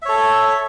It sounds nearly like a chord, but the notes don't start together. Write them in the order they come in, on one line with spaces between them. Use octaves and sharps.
E5 C#5 A4